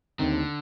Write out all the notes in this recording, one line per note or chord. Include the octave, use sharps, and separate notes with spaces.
D#2 D3 D#3 A3 C4 D#4